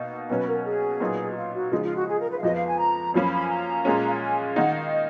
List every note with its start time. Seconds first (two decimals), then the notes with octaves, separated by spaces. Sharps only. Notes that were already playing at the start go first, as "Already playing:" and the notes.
Already playing: B2 A#3 D#4
0.29 B2 F#3 A#3 C#4 B4
0.47 A#4
0.65 G#4
1.00 A#2 F#3 B3 D#4
1.32 F#4
1.36 F4
1.55 F#4
1.72 C#3 F3 G#3 D#4 F4
1.84 F4
1.96 F#4
2.07 G#4
2.19 A#4
2.31 B4
2.38 F5
2.43 F2 F3 B3 D#5
2.55 F5
2.67 G#5
2.78 A#5
3.14 F#2 F3 A#3 C#4 B5
3.32 B5
3.41 G#5
3.49 A#5
3.85 A#2 G#3 C#4
4.05 F5
4.14 F#5
4.21 G#5
4.56 D#3 A#3 D#4 F#5
4.74 F5
4.92 D#5